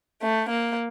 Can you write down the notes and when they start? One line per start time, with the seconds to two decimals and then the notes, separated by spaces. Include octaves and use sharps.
0.21 A3
0.49 A#3